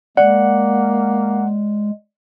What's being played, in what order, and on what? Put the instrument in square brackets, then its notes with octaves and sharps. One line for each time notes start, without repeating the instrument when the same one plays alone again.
[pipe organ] G#3 [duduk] A#3 [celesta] D5 [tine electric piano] F#5